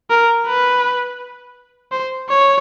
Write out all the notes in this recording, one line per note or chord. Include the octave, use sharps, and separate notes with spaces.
A#4
B4
C5
C#5